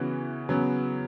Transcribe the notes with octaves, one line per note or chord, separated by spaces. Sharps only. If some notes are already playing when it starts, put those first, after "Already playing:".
Already playing: C#3 E3 B3 F#4
C#3 F#3 B3